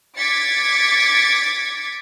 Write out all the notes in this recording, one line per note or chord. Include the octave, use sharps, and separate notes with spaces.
D6 G#6 A6 B6 C#7